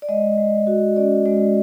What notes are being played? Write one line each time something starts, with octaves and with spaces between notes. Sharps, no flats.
D5
G#3 D#5
G#3
F#4
C#4 D5
G#3 D5